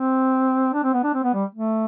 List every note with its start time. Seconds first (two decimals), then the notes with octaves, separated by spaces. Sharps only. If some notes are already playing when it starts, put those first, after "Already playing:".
Already playing: C4
0.73 D4
0.83 C4
0.93 B3
1.04 D4
1.14 C4
1.23 B3
1.34 G3
1.55 A3